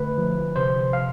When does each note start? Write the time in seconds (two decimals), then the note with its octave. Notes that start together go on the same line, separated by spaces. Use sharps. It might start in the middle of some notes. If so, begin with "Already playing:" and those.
Already playing: D3 A3 B4
0.18 F3
0.56 C3 C5
0.93 F5